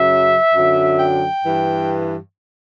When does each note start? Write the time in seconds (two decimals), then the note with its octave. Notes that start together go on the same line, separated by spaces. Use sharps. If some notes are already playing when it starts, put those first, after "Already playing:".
Already playing: F#2 C#3 F#3 E5
0.54 F#2 D3 F#3
0.98 G5
1.44 G2 E3